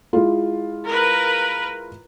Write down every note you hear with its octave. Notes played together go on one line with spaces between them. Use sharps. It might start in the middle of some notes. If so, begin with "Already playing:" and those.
G#3 E4 F4
A#4 B4